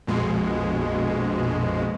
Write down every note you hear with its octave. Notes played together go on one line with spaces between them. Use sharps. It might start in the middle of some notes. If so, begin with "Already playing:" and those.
A#1 F2 B2 G#3